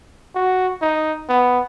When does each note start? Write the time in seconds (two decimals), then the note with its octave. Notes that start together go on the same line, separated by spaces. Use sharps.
0.35 F#4
0.81 D#4
1.29 B3